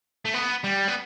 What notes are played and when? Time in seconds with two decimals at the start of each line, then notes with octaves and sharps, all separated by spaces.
0.25 A3
0.34 B3
0.64 G3
0.88 B3